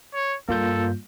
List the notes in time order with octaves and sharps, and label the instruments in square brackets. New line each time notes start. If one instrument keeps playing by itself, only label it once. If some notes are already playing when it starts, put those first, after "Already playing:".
[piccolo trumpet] C#5
[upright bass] G2 [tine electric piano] A#3 F4 G6 [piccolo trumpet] A4